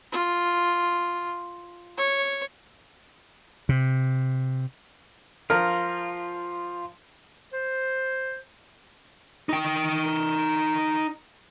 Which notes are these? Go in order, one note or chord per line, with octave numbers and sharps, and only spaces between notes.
F4
C#5
C3
F3 F4 A#4 F6
C5
D#4 G5